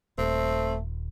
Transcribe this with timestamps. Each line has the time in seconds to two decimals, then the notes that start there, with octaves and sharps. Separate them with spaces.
0.18 D#1 A3 C4